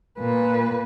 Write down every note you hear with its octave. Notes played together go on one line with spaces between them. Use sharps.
A#2 B4